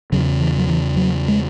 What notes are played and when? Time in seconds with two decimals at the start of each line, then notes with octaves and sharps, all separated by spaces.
0.12 E2 C#3 F#3
0.41 E3
0.58 F#3
0.68 E3
0.96 F#3
1.28 G#3